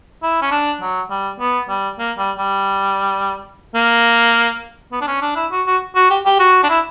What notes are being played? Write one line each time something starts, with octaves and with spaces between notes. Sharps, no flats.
E4
C#4
D4
F#3
G3
B3
G3
A#3
G3
G3
A#3
B3
D4
C#4
D4
E4
F#4
F#4
F#4
G4
G4
F#4
D4
E4